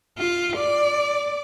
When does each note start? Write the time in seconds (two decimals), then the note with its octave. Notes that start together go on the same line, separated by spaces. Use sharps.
0.18 F4
0.56 D5